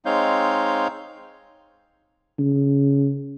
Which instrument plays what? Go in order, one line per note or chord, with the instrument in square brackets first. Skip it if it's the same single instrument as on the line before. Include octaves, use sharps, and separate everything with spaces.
[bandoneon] G#3 C4 D#4 C#5 F5 G6
[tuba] C#3